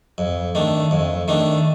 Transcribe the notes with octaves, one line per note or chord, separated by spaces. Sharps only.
F2
D#3 A3 D4
F2
D#3 A3 D4